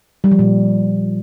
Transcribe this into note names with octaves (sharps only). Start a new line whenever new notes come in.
G3
F3
A#2